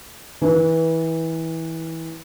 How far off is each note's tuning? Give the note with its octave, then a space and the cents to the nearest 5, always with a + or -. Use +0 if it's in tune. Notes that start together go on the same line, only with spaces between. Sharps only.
E3 -20 B4 -10